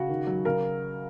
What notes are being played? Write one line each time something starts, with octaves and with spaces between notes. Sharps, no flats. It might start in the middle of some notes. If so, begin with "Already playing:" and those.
Already playing: C#3 F#4
D#3
F#3
C#3 A#4